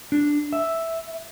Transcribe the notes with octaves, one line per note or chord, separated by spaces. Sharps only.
D4
E5